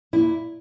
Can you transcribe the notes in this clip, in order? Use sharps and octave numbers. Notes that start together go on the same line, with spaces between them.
A#2 E4